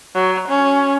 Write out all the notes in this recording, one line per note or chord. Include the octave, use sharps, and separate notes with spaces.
F#3
C#4